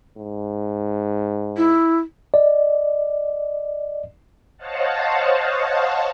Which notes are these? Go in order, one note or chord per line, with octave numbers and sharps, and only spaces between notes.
G#2
E4
D5 D#5
C5 C#5 D#5 F5 F#5 A5